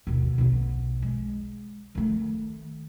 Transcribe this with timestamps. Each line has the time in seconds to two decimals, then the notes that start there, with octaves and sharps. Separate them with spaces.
0.07 D#2 B2
0.38 B1 B3
1.02 G#3
1.95 D#3 A3